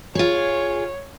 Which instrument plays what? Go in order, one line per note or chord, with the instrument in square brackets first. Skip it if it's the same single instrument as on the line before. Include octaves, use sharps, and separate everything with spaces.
[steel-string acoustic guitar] F4 G#4 [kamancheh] C#5